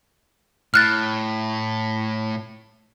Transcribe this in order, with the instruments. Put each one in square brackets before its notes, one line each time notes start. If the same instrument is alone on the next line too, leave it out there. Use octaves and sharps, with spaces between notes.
[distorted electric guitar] A2 [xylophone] F6 F#6 A6